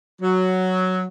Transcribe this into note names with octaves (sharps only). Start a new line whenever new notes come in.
F#3